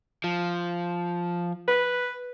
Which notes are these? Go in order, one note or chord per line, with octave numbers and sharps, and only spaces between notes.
F3
B4